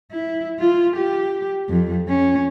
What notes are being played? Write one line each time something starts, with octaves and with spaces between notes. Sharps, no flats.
E4
F4
G4
F2
C#4